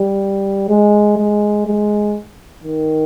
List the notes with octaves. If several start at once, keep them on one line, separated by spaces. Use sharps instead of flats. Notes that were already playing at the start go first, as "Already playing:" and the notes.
Already playing: G3
G#3
G#3
G#3
D#3